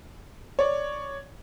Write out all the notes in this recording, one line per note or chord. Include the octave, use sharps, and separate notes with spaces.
C#5 D5